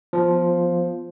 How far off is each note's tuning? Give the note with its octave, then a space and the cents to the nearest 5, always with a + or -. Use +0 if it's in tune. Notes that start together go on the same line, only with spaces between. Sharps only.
F3 +0 B3 +0